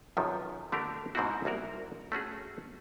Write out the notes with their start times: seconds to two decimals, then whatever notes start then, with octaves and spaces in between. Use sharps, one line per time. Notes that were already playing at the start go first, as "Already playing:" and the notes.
0.17 B1 F#2 C3 D#3 F3 F#3
0.72 D3 A3 D4 G4 A#4
1.15 G#2 B2 C4 C#4 E4 F#4
1.45 C2 A#3 F#4 A#4
2.12 A3 C#4 F#4 G#4